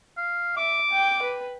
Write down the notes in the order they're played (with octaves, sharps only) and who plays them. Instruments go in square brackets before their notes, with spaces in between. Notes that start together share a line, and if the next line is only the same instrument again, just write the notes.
[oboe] F5
[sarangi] E5 [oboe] D6
[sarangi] G5
B4